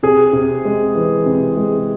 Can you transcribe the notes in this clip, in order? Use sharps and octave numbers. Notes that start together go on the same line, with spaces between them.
C3 G#4
C3
G#3
E3
C3
G#3